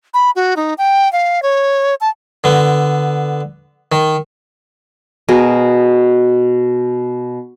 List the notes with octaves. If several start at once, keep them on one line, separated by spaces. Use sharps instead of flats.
B5
F#4
D#4
G5
F5
C#5
A5
D3 B3
D#3
B2 G#4 A#4